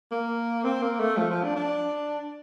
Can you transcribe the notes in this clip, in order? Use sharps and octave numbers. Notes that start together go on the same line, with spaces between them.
A#3
C4
A#3
A3
F3
F3
D4
D4